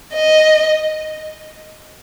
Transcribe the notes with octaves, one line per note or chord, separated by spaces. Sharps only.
D#5